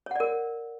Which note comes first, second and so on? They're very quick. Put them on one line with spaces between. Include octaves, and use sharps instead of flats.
C#5 F#5 D5 A#4